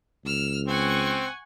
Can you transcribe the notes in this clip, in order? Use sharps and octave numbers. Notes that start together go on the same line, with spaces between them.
C#2 E6 F6
C4 F#5 G#5 C#6